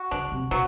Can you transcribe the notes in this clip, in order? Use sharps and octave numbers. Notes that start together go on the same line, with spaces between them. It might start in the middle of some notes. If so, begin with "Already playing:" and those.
Already playing: F#4
C#3 D4
C3
B2 F#3